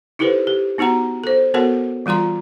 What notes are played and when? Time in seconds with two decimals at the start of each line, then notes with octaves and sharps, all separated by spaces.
0.19 D#4 E4 G4 A4 B4 C5
0.47 G4
0.78 B3 D#4 F#4 F#5 A#5
1.24 A4 C5
1.54 B3 F#4 A4 A#4 C#5 F#5
2.06 E3 G3 F4 A#5 C6